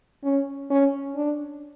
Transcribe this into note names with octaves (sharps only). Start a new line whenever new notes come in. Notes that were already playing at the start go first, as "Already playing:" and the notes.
C#4
C#4
D4